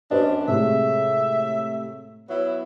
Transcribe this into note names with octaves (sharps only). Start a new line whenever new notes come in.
F#2 D4 B4 C5 D#5
A2 C3 G#3 E5
F#3 B3 E4